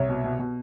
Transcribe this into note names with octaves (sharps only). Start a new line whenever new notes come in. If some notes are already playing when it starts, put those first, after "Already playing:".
Already playing: C2 C#5
B2
B2
B2